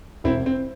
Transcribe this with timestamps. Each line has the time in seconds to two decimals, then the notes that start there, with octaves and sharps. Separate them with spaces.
0.24 E1 C4 E4
0.46 C4